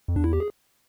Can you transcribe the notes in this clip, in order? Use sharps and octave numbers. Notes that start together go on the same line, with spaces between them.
F2
E2 D4
E4
G4
G#4